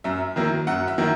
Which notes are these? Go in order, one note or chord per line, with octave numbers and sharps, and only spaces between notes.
F#2 E5
D#3 F#3 A#3 E4
F#2 F#5
E5
D#3 F#3 A#3 E4